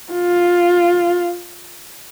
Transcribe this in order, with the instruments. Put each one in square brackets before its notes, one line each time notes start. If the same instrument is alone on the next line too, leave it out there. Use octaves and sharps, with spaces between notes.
[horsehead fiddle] F4